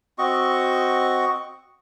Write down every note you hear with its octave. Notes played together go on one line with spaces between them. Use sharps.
C4 F#4 D#5 C#6